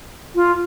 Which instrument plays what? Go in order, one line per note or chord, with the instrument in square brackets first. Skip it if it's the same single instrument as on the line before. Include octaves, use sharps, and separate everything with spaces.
[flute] F4